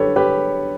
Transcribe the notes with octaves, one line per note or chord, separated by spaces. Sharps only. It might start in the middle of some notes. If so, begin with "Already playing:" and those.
Already playing: F#2 D3 G3 G4 A4 B4 C#5
G4 B4